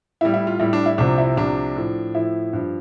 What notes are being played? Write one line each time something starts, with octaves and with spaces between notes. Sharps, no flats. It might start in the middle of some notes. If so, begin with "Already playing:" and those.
A2 G3 E4
E4
F4
A2 G3 E4
D4
E4
C2 C3 F3 D4
E4
C2 C3 F3 D4
A2 F3
A2 F3 E4
G2 F3